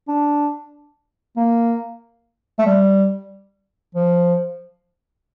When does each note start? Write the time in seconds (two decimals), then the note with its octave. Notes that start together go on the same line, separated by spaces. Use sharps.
0.08 D4
1.37 A#3
2.59 A3
2.66 G3
3.95 F3